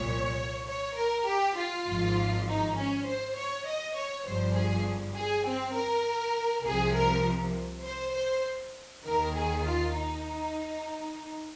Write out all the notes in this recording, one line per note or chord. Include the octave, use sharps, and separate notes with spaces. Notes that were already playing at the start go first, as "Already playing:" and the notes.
Already playing: C2 A#2 F3 C#5
C#5
A#4
G4
F4
G#1 G#2 F3
D#4
C#4
C5
C#5
D#5
C#5
G1 G2 F3 C5
G#4
G#4
C4
A#4
C2 C3 F3 G#4
A#4
C5
C5
D#2 D#3 A#4
G#4
F4
D#4